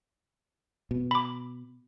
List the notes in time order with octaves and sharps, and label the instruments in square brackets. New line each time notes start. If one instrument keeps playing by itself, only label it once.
[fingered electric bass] B2
[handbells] B5 D6